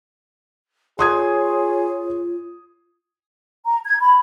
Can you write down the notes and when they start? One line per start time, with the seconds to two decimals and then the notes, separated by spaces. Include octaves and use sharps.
0.99 F4 G#4 C#5 C6 D#6 G#6
3.66 A#5
3.85 G#6
4.02 B5